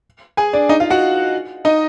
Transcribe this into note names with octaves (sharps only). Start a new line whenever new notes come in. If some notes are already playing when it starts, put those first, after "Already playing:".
G#4 G#5
D4 D5
D#4 D#5
F4 F5
F#4 F#5
D#4 D#5